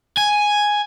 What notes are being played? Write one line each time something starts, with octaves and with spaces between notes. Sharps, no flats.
G#5